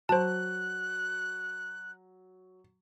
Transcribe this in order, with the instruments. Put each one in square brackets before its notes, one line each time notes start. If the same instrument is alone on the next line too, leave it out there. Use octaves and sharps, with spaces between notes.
[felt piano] F#3 [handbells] C5 A5 [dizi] F#6